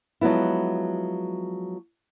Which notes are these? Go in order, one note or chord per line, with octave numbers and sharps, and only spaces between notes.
F3 F#3 G#3 B3 E4